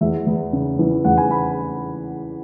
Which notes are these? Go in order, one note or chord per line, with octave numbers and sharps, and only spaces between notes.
E2 E5
E2
C#3
E3
E2 F#5
G#5
B5